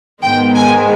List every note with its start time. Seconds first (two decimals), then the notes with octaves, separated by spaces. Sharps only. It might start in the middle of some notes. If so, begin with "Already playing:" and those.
0.22 G#2 D#3 G#3 B3 G5
0.55 G#5